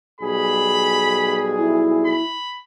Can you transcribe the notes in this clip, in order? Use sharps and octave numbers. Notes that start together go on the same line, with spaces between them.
B1 G3 G#4 B5
E4
B5